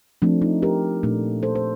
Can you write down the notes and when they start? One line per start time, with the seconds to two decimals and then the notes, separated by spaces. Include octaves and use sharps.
0.22 F3 A3 C4 D4
0.42 D#4
0.63 G4 A#4
1.03 A#2 A3 D4
1.43 A4 C5
1.55 C5